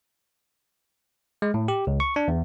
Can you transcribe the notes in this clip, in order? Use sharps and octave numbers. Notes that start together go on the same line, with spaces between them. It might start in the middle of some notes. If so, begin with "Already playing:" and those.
G#3
A2
G4
C#2
C#6
D4
E2